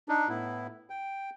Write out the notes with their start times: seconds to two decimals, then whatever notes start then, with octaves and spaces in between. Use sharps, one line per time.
0.09 D4 D#4
0.29 A2 B3 E4
0.90 G5